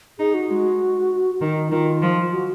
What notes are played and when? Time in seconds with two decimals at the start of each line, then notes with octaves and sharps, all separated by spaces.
0.19 D#4 G#4
0.34 F#4
0.49 G#3 F#4
1.41 D#3 D#4
1.71 D#3 F4
2.02 F3
2.32 F#4